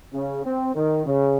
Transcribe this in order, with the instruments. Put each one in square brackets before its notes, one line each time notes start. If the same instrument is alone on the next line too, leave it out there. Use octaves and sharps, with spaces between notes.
[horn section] C#3
C4
D#3
C#3